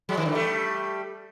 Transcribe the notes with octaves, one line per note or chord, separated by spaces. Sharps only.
F#3 G#3
D#3 F3
D3 E3
G3 A3